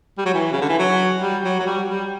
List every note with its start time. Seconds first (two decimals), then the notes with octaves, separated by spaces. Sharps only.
0.18 G3
0.25 F#3
0.34 E3
0.52 C#3
0.61 D3
0.69 E3
0.79 F#3
1.22 G3
1.44 F#3
1.60 F#3
1.66 G3
1.89 G3